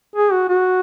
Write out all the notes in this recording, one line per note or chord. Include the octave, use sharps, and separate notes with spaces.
G#4
F#4
F#4